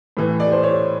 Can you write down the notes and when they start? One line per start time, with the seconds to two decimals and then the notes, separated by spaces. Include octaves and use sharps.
0.17 A2 E3
0.40 D5
0.52 C5
0.64 C#5